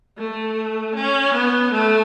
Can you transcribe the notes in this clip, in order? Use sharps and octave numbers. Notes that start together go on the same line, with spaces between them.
A3
C#4
B3
A3